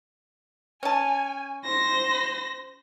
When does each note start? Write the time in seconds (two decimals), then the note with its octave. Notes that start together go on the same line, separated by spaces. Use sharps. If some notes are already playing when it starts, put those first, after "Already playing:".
0.83 C#4 G#5 A5
1.65 C5 A#6